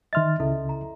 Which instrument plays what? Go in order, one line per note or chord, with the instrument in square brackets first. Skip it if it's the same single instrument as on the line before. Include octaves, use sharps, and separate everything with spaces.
[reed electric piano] D#3 F6 A6 [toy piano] D#5 E5 C6
[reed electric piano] C#2 C#3 [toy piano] E4 A4 E5
[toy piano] A#5